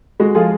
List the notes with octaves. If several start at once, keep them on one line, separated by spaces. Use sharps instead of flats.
G#3 F#4
F3 F4 G#4